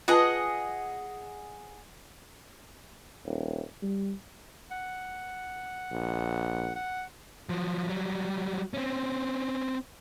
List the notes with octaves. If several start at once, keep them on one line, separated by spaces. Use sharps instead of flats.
F4 G#4 B4 D#5 F#5 A5
D#1
G3
F#5
A#1
F#5
F3 F#3
F#3 G3
C4 C#4